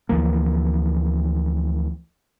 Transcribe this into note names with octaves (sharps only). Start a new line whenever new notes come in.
D2 E3 F3 A#3